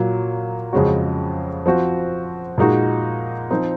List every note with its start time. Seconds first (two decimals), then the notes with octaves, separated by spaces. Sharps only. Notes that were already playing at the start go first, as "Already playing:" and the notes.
Already playing: A#2 F#3 A#3
0.73 F2 C#3 G#3 C#4 F#4
1.66 F3 C4 F#4
2.58 A#2 G#3 D#4 F#4
3.51 F3 C4 D#4